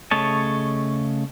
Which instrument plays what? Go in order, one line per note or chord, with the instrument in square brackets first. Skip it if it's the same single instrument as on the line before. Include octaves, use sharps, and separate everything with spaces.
[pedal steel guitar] C#3 A3 C#5 D#5 A5